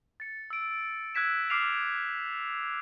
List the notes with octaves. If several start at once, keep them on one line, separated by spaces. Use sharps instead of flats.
A6 C#7
E6 D7
E6 F#6 G#6 B6 E7
D6 F6 C7 D7 E7 F7